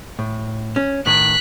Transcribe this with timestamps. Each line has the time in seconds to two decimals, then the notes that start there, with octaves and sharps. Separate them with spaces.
0.19 A2
0.76 C#4
1.06 A2 D#3 F#6 B6